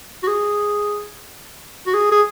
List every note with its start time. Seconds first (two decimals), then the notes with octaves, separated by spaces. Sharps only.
0.23 F#4
0.28 G#4
1.86 F#4
1.94 G#4
2.12 G#4